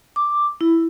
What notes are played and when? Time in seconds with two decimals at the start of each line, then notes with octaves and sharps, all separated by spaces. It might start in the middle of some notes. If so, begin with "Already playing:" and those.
0.16 D6
0.61 E4